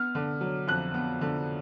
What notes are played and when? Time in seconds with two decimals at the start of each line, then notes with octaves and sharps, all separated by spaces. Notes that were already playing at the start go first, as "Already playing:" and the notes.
Already playing: B3 F6
0.15 D3
0.41 F#3
0.68 F2 F#6
0.94 B3
1.21 D3